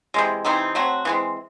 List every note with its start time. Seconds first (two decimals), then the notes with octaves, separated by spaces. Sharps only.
0.14 C3 E3 G#3
0.45 C3 E3 C4 D#4
0.75 F#3 A3 C4 F#4
1.05 E3 G#3 C4